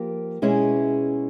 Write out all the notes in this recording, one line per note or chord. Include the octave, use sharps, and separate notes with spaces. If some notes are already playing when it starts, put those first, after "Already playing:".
Already playing: F3 A#3 G4
B2 G#3 C#4 E4 G#4